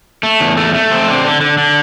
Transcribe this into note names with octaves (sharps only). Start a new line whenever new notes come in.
A3
E2
A3
A3
C4
D3
D3
D3
D3